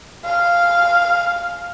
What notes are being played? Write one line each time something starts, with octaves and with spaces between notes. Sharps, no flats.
F5